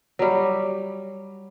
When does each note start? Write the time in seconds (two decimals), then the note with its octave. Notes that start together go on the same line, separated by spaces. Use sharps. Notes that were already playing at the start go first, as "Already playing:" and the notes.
0.19 F#3 G3